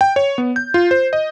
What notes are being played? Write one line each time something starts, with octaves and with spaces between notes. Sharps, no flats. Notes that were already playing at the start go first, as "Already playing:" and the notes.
G5
C#5
B3
G6
F4
C5
D#5